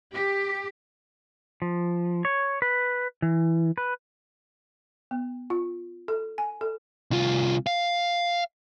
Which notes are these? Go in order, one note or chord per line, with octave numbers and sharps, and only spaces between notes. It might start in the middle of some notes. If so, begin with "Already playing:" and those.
G4
F3
C#5
B4
E3
B4
B3
F4
A4
G#5
A4
C2 F4
F5